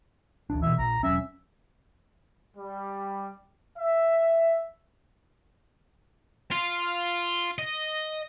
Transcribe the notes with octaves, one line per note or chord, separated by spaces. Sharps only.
D1 A1 D4
B2 D3 E3 E5
A#1 A#5
E1 F#3 C#4 E5
G3
E5
F4
D#5